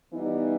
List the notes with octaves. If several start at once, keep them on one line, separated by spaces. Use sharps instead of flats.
E3 G3 B3 D#4